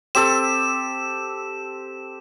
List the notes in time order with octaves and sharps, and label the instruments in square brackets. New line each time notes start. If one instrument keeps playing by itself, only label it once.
[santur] C4 G4 A4 [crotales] E7